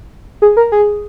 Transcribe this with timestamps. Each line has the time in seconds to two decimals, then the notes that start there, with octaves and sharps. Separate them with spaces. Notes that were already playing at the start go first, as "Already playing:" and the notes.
0.42 G#4
0.57 A#4
0.72 G#4